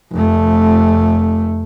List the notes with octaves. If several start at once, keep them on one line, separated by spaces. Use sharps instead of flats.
F1 A3